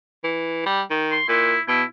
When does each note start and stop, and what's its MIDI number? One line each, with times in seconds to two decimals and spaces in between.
0.24 0.64 52
0.66 0.81 55
0.90 1.17 51
1.12 1.27 84
1.29 1.55 46
1.29 1.61 64
1.68 1.83 47
1.68 1.83 64